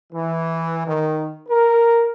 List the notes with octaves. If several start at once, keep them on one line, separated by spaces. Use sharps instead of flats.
E3
D#3
A#4